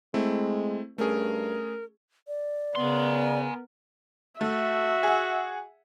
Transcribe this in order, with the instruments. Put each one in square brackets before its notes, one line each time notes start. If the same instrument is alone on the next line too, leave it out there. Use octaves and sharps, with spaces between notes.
[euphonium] G#3 [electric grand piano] A3 C4 E4
[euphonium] G2 [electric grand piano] A3 C#4 G#4 [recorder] A#4
[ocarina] D5
[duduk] C#3 [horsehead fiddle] B3 A#4 [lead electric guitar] G#5 C6
[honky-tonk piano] A3 [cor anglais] F#4 [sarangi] E5
[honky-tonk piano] G#4 F#5